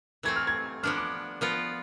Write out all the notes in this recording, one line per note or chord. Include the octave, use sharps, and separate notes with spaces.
E3 A3 C4 G#6
F6
G#6
F3 B3 D4 F6
D6
F3 B3 F4